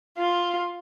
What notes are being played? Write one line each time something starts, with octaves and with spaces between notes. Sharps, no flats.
F4